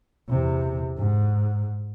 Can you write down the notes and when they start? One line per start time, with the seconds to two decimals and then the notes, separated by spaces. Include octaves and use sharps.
0.29 E2 C3
0.98 G#2